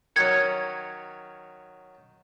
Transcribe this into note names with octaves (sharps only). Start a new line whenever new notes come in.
D#3 F#3 C#4 G#6 C#7